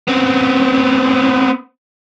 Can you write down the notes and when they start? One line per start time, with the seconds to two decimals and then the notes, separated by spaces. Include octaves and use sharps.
0.08 B3 C4